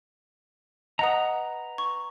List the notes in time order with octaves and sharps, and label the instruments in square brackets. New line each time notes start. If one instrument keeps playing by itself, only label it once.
[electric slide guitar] B4 A#5 [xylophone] D#5 F#5 D#6
[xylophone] C#6